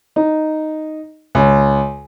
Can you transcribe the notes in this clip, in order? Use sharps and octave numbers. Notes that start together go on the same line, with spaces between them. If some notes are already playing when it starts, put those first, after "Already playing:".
D#4
C#2